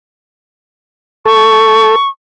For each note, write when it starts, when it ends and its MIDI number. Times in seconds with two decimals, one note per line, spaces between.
1.26 1.96 69
1.26 2.09 85